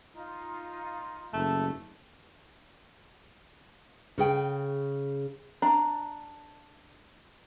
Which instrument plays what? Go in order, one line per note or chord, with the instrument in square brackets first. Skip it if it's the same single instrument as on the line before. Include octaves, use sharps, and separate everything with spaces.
[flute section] D#4 F4
[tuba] F#1 [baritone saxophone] A3
[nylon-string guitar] C#3 G#4 G5
[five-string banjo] D4 A#5